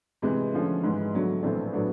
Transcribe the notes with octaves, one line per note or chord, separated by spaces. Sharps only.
C3 E3 G#3
D3 F3 A3 C#4
G#2 E3 G#3
D3 F#3 A3
A#1 A2 E3 A3 C4
A2 F#3 B3 D4